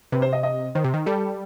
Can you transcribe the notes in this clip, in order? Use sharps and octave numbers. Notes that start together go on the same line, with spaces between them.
C3 B4
C5
D#5
D#5
D#3 C5
C3
D#3
G3 A4